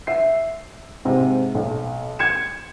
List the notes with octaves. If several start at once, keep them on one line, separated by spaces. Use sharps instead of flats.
E5 C7
G#2 C3
B1
G#6 C#7 E7